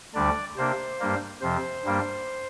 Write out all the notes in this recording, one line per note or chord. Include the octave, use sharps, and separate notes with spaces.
D2 D3 G3 D4 D5
C3 A#3 D4 C5
G2 G3 A#3
F2 C3 F3 C5
G2 G3 A#3 D4